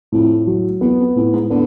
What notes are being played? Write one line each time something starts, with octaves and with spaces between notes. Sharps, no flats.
F2 A2
F#3
E2 B3
F2
F2 A2
G#2
D3 B3